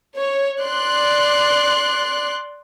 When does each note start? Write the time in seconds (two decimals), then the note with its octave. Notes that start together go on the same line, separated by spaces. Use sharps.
0.16 C#5
0.60 D5 C6 F#6